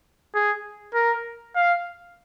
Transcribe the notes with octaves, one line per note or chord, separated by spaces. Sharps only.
G#4
A#4
F5